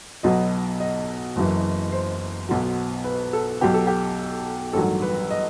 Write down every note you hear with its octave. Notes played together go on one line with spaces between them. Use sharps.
B1 B2 F#3 D#5
D#5
F#1 F#2 E3
C5
B1 B2 F#3
B4
A4
B1 B2 F#3 G4
A4
G4
A1 G2 D#3 F#3 A4
B4
D#5